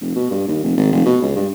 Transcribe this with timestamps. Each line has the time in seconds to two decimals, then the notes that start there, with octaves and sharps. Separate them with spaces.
0.01 F1
0.15 B2
0.31 G2
0.48 D#2
0.63 F1
0.77 G#1
0.92 F1
1.06 B2
1.22 C#2
1.36 G2